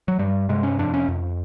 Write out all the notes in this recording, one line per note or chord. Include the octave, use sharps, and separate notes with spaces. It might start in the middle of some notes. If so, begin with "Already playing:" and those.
F#3
G2 G3
C3 G#3
C#4
F2 D4
C#4
F2